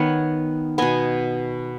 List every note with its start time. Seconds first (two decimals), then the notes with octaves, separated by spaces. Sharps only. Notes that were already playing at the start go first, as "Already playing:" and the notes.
Already playing: D#3 B3 C#5 F#5
0.78 B2 B3 D#5 G#5